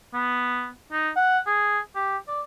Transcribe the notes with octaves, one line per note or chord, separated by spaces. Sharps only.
B3
D#4
F#5
G#4
G4
D5